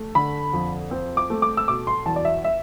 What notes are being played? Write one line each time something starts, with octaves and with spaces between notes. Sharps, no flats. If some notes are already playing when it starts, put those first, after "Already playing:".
Already playing: A3
D3 B5
F2
C4
D6
A3
D6
E6
B2 D6
C6
E2 A5
D5
E5
E5